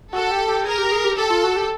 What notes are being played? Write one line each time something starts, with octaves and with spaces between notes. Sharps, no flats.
F#4 A4
G4
G4
G#4 A#4
G4
G#4
G4
G4 A4
F4
F#4
G4